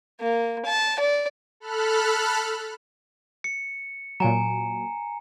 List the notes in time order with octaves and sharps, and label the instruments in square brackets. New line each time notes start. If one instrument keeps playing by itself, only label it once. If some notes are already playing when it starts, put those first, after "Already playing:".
[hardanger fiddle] A#3
A5
D5
[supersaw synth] A4 B5 F6 F#6
[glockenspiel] C#7
[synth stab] A#2 F#3 [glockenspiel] G#5 A#5